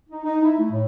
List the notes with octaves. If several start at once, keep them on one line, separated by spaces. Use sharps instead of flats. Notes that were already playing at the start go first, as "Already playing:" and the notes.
D#4
D#4
E4
A3
A2